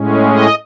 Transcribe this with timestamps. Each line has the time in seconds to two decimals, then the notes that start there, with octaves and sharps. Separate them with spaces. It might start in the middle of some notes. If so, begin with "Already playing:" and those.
Already playing: A2 G#3 C#4
0.30 D#5